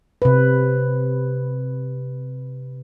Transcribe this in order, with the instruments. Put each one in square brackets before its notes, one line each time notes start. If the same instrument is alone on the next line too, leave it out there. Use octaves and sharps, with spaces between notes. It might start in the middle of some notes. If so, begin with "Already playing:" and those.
[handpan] C3 B4